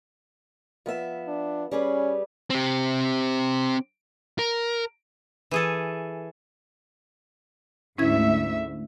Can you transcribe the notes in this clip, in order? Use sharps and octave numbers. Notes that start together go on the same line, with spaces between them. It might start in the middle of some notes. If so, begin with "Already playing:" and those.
F3 B3 E5
D4
G3 C#4 G#4 B4
C4 G4
A#4
E3 G#4 A4
D2 G#2 C#4 E4 E5 G#6